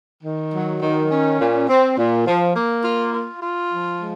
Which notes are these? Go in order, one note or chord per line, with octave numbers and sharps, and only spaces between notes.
D#3
F#3
D#3
C#4
A#2
C4
A#2
F3
A#3
F4
F4
F4
F3
G#3